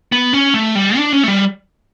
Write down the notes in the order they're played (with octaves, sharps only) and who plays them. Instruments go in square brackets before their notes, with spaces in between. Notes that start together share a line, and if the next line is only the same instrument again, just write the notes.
[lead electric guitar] B3
C#4
A3
G3
D4
C#4
A3
G3